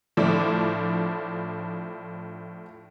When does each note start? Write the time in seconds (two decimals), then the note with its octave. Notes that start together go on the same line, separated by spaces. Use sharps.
0.17 A2 F3 D4 E4